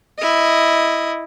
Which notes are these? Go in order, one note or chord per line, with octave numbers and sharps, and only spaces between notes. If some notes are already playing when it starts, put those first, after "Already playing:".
E4 D#5